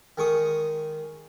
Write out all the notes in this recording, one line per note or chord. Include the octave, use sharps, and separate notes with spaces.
D#3 G#3 C#6 D#6